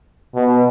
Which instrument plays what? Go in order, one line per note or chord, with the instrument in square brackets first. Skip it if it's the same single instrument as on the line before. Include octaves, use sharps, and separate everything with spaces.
[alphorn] B2